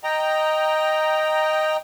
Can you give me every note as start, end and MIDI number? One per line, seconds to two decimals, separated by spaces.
0.04 1.77 75
0.04 1.77 79
0.04 1.77 82